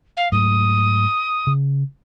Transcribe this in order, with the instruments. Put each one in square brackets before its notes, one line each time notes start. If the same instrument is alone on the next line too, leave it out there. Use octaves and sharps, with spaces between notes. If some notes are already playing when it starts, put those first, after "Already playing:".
[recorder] F5
[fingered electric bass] G#2 F#3 A3 [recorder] D#6
[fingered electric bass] C#3